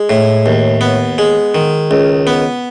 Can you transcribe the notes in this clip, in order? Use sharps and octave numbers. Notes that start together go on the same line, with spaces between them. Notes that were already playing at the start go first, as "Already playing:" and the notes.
Already playing: G#3
A2
D#2
B3
G#3
D#3
C#2
B3